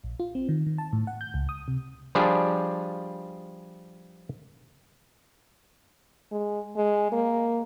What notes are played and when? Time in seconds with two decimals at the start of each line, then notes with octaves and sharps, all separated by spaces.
0.04 A#1
0.20 F4
0.35 C4
0.49 D#3
0.66 D#3
0.78 A5
0.93 A2
1.07 F#5
1.21 G6
1.34 C#2
1.49 D#6
1.68 C3
2.15 F3 G3 D4 G#4
6.31 G#3
6.76 G#3
7.12 A#3